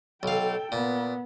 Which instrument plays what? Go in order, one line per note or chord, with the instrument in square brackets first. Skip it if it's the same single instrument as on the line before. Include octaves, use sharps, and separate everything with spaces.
[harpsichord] B1 F5 [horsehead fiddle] A4 G5
[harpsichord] A#2 [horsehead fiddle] B3